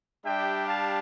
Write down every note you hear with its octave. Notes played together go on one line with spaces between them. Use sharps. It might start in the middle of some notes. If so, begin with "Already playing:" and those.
G3 D4 G4 E5 G5
F5 A5